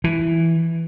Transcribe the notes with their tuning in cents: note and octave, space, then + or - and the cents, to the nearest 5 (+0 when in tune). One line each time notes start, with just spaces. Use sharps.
E3 +0